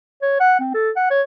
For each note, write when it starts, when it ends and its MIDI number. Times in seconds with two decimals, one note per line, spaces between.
0.22 0.37 73
0.40 0.55 78
0.60 0.74 60
0.75 0.90 69
0.97 1.06 78
1.11 1.22 73